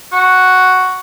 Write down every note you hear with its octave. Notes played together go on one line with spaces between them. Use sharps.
F#4